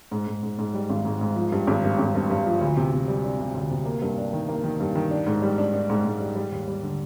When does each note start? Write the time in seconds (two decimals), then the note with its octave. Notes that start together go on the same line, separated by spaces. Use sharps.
0.11 G#2
0.27 G#2
0.43 G#2
0.58 G#2
0.74 G3
0.90 G#1
1.05 G#2
1.21 G#2
1.36 F3
1.52 G2
1.67 G#1
1.84 G2
1.99 G#1
2.15 G2
2.30 G2
2.46 F3
2.61 D2
2.77 C3
2.92 C3
3.08 G3
3.24 D4
3.39 C3
3.55 D2
3.70 C3
3.86 A#3
4.02 G2
4.18 D4
4.33 D#3
4.49 A#3
4.64 D#3
4.80 G2
4.95 D#3
5.11 D4
5.26 G#2
5.42 G3
5.58 D4
5.73 D4
5.89 G#2
6.05 G#2
6.20 G3
6.35 G3
6.52 D#2
6.68 G3
6.83 D3